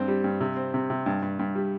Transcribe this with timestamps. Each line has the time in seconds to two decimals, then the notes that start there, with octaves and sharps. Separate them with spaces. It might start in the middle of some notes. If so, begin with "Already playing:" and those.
Already playing: G2 C4
0.08 G3
0.24 G2
0.41 C3
0.57 C4
0.74 C3
0.90 C3
1.06 G2
1.22 G2
1.39 G2
1.55 G3